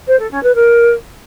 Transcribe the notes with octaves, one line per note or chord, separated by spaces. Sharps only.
C5
A4
C#4
B4
A#4